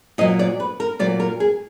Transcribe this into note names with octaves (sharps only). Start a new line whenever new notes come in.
A#2 F#3 D#5
D5
B4
A#4
A#2 F#3 D5
A#4
G#4